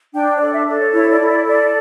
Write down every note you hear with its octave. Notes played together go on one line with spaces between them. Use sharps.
D4 G5
C#5
A4 D5
E5
A4 D5
C#5
E4 C#5
D5
E4
D5
A4 D5